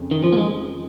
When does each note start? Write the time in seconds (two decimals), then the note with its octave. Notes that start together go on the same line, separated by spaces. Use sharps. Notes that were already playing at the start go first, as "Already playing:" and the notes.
Already playing: F2 C#3
0.11 D#3
0.24 F3
0.33 A#3
0.37 G#3